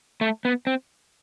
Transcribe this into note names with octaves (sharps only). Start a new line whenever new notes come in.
A3
B3
C4